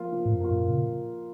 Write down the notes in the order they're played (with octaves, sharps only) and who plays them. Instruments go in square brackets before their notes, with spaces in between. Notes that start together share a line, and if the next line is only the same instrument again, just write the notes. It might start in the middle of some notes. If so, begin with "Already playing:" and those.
Already playing: [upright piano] F3 A#3 F4
F3
[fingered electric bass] A2
F#2
[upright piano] A#3 F4
[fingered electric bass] F#2 A#2
A#2 C#3